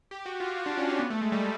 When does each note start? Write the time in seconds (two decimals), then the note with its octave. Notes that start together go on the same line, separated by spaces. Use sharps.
0.11 G4
0.26 F#4
0.40 F4
0.56 F#4
0.66 D4
0.77 C#4
0.88 C#4
0.99 B3
1.10 A3
1.22 G#3
1.32 G3